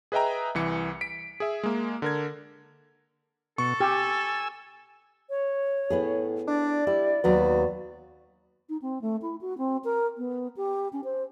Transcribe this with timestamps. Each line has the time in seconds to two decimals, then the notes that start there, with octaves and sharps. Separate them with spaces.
0.12 G#4 B4 D#5 E5 G5 A#5
0.55 C2 E3 C#7
1.01 B6 D7
1.40 G#4 E5
1.63 G#3 A#3
2.02 D3 A#4 G#6
3.58 B2 A4 C#6
3.80 G4 G#5 E6
5.30 C#5
5.90 A2 B3 E4 G#4
6.47 D4 D5
6.87 G3 E4
7.24 D#2 F#3 B3 F#4
8.69 D#4
8.82 C4
9.01 A3
9.22 E4
9.41 F#4
9.58 C4
9.84 A#4
10.18 B3
10.56 G4
10.93 C#4
11.04 C5